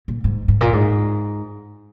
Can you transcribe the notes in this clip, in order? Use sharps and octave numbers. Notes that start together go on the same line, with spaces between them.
A#2
G#2
G#2
A#2
G#2